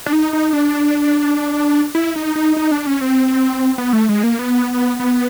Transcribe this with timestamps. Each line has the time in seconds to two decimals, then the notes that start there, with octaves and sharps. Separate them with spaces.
0.06 D4
0.13 D#4
0.33 D#4
0.53 D4
1.95 E4
2.16 D#4
2.36 D#4
2.57 D#4
2.71 D4
2.87 C#4
3.01 C4
3.78 B3
3.93 A3
4.09 G#3
4.23 A#3
4.39 B3
5.00 B3